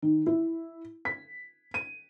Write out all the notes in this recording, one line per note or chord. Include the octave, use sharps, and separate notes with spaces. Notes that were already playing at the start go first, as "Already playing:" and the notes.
D#3
E4
B6
D#7